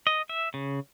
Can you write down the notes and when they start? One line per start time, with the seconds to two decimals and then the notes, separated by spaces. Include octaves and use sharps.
0.07 D#5
0.29 E5
0.54 C#3